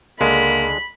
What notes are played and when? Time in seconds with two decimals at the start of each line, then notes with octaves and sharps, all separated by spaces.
0.21 C#2 D3 G#3 A#3 B5